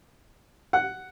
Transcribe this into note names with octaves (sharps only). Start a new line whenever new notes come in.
F#5